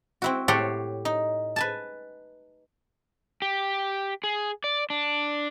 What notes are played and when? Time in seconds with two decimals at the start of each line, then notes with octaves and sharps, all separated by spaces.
0.22 C4 E4 F#4
0.48 A2 G4 A4 C#5 F#5 C6
1.05 D#4
1.56 B4 G#5 A5
3.42 G4
4.24 G#4
4.64 D5
4.90 D4